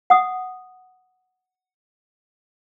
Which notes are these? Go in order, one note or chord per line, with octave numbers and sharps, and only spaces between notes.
F#5 D#6